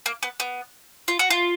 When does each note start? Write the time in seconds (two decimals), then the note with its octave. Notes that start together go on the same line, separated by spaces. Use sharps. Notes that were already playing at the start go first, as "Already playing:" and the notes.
0.06 A#3
0.23 B3
0.40 B3
1.08 F4
1.19 F#4
1.30 F4